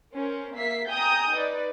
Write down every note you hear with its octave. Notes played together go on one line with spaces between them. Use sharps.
C#4 A#4 C5
A#3 E5 B6 C7
G5 G#5 A#5 D#6 G6
D#4 B4 D5